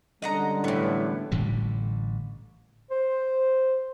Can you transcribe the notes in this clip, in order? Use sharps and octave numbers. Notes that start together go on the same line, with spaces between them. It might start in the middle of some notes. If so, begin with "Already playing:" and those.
D3 G3 G#3 C#4 D#5 F#5 A#5
A2 E3 B3
A1 A2 D3 G3
C5